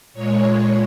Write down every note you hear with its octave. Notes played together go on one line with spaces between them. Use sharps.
A#2 G#3 C#5